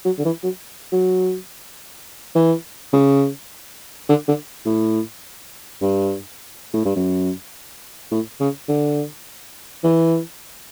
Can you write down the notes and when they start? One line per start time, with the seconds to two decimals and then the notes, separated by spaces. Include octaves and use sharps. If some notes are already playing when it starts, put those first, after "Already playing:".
0.05 F#3
0.18 D3
0.25 E3
0.43 F#3
0.92 F#3
2.35 E3
2.93 C#3
4.09 D3
4.28 D3
4.66 A2
5.81 G2
6.73 A2
6.85 G2
6.96 F#2
8.11 A2
8.40 C#3
8.69 D3
9.84 E3